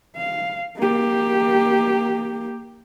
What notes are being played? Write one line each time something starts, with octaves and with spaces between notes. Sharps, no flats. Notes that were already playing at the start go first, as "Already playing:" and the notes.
F5
A#3 G4